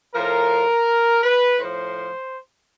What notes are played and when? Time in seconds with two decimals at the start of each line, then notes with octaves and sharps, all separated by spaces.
0.14 A2 F3 A#4
1.24 B4
1.59 A2 F3 C5